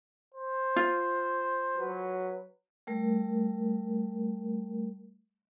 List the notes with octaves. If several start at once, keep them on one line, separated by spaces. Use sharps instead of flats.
C5
F4
F#3 B4
G3 A3 A#4